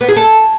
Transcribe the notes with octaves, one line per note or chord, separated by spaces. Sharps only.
B3
G#4
A4